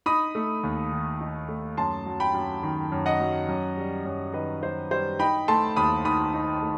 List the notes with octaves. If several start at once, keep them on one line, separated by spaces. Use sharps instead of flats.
D#4 B5 D#6
A3
D#2
D#3
D#4
A3
F#2 A5 C6
F#3
G5 B5
F#2
D#3
F#2
D#5 F#5
F#3
F#2
G3
F#2
D#3 B4 D#5
F#2 C5
G3 C5
D#4 G5 B5
A3 A5 C6
D#2 B5 D#6
D#3 B5 D#6
D#4
A3